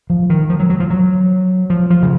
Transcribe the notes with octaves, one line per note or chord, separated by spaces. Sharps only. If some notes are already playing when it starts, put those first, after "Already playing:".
F3
D#3
F3
F#3
F#3
F3
F#3
F3
F3
C#3